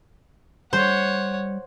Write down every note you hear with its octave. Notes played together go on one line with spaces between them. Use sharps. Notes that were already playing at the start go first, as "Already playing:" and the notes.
G3 C5 C#5 F#5